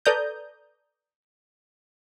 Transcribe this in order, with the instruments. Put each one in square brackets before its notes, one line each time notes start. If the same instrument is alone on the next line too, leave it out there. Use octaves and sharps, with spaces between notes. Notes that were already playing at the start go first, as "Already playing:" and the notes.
[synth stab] A4 B4 D5 A#5 D#6 G6